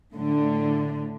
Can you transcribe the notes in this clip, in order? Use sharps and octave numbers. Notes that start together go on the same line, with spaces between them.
A2 D3